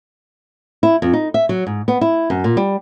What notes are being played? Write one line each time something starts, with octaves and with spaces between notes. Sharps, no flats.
E4
F2
D#4
E5
F#3
G#2
B3
E4
F#2
A#2
G3